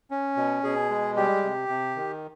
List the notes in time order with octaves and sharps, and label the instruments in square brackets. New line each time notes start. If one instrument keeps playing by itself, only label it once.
[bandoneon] C#4
B2
B2 G#4
G#3
G3 G4
C3
C3
D#3